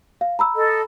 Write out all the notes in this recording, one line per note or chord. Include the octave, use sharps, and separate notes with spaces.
F5
A#5 B5 E6
A4 D#5